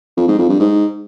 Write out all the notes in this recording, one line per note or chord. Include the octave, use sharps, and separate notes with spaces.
F2
G#2
F2
G2
G#2